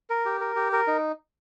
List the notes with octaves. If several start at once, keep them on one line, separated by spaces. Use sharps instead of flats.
A#4
G4
A#4
G4
A#4
D#4